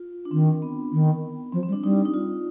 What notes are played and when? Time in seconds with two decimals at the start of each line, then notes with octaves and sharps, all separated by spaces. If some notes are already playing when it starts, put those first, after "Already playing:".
Already playing: F4
0.25 D4
0.31 D#3 C4
0.62 B3
0.92 D#3
1.53 F3 C4
1.63 C4
1.68 G3
1.72 D4
1.83 G3 D#4
2.05 D#4
2.14 F4